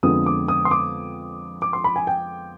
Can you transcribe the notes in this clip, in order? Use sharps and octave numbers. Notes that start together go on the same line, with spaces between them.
F2 D3 F3 G#3 B3 D#6
D6
D#6
C6
D6
D6
C6
B5
G#5
G5